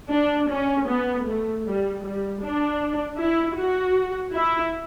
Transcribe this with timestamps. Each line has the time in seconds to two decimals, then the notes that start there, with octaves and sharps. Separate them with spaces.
0.12 D4
0.50 C#4
0.89 B3
1.28 A3
1.66 G3
2.04 G3
2.43 D4
3.19 E4
3.58 F#4
4.35 E4